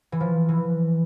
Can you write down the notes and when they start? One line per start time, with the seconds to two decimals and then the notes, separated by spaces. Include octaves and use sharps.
0.12 E3
0.20 F3
0.49 E3